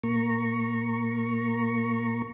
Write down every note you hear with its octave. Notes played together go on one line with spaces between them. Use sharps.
A#2 A#3 A#5 C#6